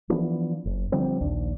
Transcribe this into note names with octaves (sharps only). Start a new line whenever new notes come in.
E3 F3 B3 D4
F#1
D3 F3 G3 C4
A#1 D#2 D4